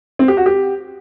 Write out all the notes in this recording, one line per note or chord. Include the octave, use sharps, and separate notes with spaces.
C4
G4
F#4
G4